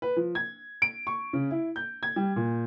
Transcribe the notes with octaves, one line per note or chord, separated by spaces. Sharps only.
B4
F3
G#6
D7
C#6
C#3
E4
G6
G#6
G3
A#2